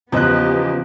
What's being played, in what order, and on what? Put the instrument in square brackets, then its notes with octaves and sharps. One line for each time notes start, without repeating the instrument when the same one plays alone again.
[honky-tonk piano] E2 D#5 F#6 [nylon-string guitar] C#3 F3 [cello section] B3 G4